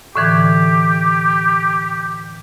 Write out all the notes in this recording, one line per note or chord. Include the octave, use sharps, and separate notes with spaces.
A2 D3 E3 G4